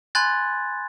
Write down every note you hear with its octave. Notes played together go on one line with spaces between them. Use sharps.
G#5 B5 C6 F#6 G#6 A6